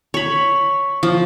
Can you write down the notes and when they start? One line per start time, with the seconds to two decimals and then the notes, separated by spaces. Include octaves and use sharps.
0.14 C#5 B5
1.03 F3